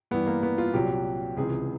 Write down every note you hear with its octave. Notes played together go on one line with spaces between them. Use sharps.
G2 E3 B3
A#3
B3
F4
C2 A#2 F#3 G4
C#2 C3 E3 G#4